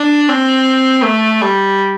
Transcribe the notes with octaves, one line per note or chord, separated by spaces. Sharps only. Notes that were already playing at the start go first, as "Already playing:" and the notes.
Already playing: D4
C4
A3
G3